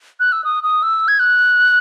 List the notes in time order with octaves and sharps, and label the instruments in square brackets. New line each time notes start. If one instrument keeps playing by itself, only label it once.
[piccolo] F#6
E6
D#6
D#6
E6
G#6
F#6